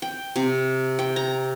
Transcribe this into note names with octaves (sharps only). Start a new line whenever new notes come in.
G5
C3
G5
A#5